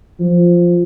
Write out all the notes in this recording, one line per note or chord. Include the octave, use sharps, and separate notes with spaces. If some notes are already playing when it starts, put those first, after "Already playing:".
F3